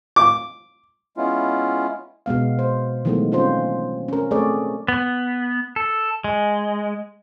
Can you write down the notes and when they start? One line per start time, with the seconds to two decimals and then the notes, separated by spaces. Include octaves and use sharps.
0.16 D6
1.17 G#3 B3 C#4 E4 F4
2.26 B2 G#3 B3 F5
2.59 C5
3.05 D#3 E3 F#3 G#3 A3 B3
3.32 C4 C#4 F4 C5
4.08 C#4 A#4
4.31 A3 C4 G#4 C#5 D5
4.88 B3
5.76 A4
6.24 G#3